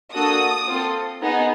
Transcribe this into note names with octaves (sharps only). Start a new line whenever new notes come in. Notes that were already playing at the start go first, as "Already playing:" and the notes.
A#3 D4 F#4 A4 D#6
C4 F4 A4
B3 D#4 G#4